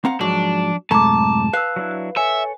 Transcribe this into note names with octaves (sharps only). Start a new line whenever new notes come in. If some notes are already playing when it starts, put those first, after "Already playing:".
C4 F5 F#5 A#5
G#2 F3 F#3 D4
F#2 A2 C3 G#3 A3 A5 A#5 D6
B4 F5 E6 F#6
F#3 D4 E4
A4 C#5 E5 G#5